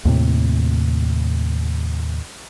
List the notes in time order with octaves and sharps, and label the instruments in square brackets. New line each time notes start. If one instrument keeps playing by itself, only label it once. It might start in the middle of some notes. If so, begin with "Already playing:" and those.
[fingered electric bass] D#2 A2 C3